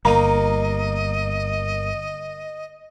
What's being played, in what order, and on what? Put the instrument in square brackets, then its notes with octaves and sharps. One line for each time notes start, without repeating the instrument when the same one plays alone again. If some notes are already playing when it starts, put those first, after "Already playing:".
[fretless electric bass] G1 [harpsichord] A#3 D#4 [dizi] D#5 [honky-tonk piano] A#5 D#7